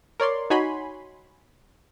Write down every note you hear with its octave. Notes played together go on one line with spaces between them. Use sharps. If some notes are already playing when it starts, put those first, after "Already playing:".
A#4 C#5 D5 C6
D#4 F#4 C#5 G#5 B5 C6